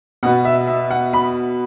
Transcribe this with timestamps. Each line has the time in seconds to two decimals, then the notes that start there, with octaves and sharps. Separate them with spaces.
0.23 B2 F#5
0.26 B3
0.45 E5
0.67 E5
0.91 F#5
1.13 B5